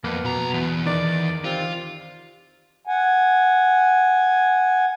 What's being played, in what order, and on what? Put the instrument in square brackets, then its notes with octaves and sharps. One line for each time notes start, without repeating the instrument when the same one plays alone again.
[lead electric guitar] F2 [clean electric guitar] A#3 [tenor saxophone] B3
[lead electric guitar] B1 A#5 [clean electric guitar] B2
[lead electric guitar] E2
[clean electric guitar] D#3 [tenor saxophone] D5
[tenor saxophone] C3 [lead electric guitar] F4
[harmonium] F#5 G#5